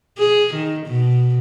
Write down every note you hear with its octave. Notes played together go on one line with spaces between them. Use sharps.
G#4
D#3
B2